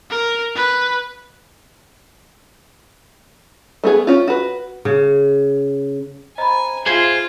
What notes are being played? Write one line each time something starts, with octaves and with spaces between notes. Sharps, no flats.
A#4
B4
A3 B3 G#4
C#4 F4
F#4 B4
C#3
C5 D#5 G#5 A#5 B5
F4 G#4 C5 E5 F5 G#5 G#6